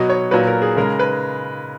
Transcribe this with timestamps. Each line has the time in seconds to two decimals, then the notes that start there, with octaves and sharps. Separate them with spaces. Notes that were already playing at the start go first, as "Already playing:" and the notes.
Already playing: B2 F#3 D#5
0.09 C#5
0.31 A#2 F#3 B4
0.47 A#4
0.62 G#4
0.76 C#3 G#3 A#4
0.99 B4